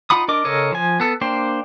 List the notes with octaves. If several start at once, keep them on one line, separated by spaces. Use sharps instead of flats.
D#4 F4 F#5 B5 D#6
D4 A#4 D#5 D6
C#3 A4 A#4 C#5 D#5
F3 G#5
B3 A4
A#3 D4 C5 G5